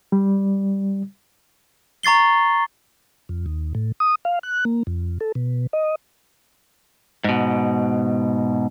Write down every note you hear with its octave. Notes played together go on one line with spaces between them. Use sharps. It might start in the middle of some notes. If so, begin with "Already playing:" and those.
G3
A#5 C#6 A6 C7 G7
F2
D#2
A2
D#6
F5
F#6
A#3
F2
A4
B2
D#5
G#2 B2